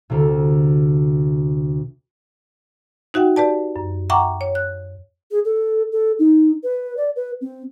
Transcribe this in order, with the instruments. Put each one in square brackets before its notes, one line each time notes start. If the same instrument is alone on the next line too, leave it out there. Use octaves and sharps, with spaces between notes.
[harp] D2 C3
[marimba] D#4 F#4 E5 F#5 G5
G4 B4 D5 A5
F#2
E5 F#5 G5 A#5 C#6 D6
C#5
F#6
[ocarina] G#4
A4
A4
D#4
B4
D5
B4
C4